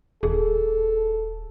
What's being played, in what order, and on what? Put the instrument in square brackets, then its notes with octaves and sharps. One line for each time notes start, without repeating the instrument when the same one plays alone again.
[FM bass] D#1 [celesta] G#4 [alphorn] A4